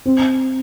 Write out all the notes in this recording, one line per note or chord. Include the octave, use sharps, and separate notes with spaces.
C4